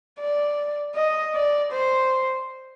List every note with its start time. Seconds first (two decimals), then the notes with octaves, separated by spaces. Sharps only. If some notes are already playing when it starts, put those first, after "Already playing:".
0.20 D5
0.96 D#5
1.35 D5
1.73 C5